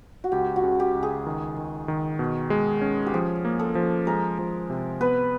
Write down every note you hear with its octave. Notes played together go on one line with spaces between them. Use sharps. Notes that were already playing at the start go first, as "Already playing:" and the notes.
F#4
C#2 G4
F#4
C#3
G4
C#2
G#4
D#3
D#3
D#3
B2
G#3
C#4
G4
F3 G#4
A#3
A4
F3
G#3 A#4
F3
C3
B3 B4